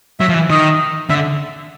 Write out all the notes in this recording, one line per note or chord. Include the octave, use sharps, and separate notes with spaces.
F#3 E5
F3
E3
D#3 D#5
D3 E5